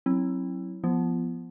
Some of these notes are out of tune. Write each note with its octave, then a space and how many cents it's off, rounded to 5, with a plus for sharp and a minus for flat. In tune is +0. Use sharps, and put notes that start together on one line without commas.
F#3 +0 C4 +25 E4 +0
F3 +0 B3 -5 F4 -40